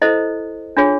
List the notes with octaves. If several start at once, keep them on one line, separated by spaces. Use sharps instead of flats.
E4 A4 C5 D#5
D4 F4 G#4 C#5